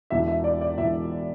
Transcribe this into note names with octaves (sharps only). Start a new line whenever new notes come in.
E1 E2 B2 E5
E5
D5
D5
E1 E2 B2 E5